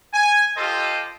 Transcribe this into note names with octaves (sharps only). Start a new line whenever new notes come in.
G#5
F4 G4 A4 C5 D#5